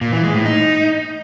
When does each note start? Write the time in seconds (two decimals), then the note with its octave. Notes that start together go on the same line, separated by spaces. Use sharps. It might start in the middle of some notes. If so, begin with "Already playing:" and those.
0.01 A#2
0.12 E3
0.23 G#3
0.34 A2
0.45 D#4